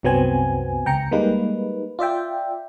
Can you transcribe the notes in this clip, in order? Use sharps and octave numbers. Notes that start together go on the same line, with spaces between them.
C2 F#2 F#3 B3 C4 G#5
C#2 G5 A#5 C#7
G3 G#3 A#3 D#4 B4
F4 D5 E5 G5